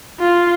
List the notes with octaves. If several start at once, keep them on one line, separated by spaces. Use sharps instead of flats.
F4